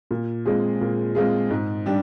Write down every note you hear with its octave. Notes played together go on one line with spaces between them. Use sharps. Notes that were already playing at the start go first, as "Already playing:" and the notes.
A#2
G#3 C4 F4 G#4
A#2
G#3 C4 F4 G#4
G#2
G3 D4 G4